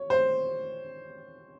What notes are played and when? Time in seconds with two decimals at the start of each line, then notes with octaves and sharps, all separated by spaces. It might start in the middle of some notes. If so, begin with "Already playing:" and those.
Already playing: C#5
0.10 C5